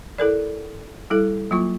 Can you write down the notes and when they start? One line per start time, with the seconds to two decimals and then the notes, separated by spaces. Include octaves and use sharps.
0.18 E4 A4 A#4 D5
1.10 G3 E4 A4
1.51 F#3 A#3 F4 C#6